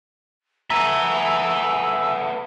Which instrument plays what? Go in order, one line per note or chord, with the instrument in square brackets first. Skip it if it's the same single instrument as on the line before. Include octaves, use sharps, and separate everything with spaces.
[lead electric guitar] A3 B3 [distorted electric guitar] E5 G#5 [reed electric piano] A#5 [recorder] E6